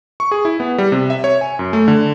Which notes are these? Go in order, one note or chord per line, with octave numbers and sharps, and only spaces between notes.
C#6
G#4
E4
B3
G3
C3
E5
C#5
G#5
F#2
A3
D3